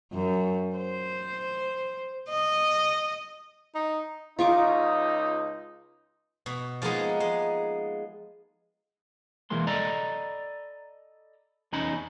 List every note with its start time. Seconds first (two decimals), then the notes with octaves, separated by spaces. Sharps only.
0.13 F#2
0.76 C5
2.29 D#5
3.75 D#4
4.39 C#2 D#4 F4 C#6 D6
6.46 B2
6.82 F3 G#3 A#3 B3 D#4 G#4
7.20 G#3
9.50 E3 G#3 A#3 C6
9.67 A4 D5 D#5 A#5 B5
11.73 E2 C#4 D#4 D#5 B5